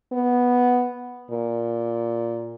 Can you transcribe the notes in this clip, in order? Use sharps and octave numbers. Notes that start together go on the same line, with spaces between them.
B3
A#2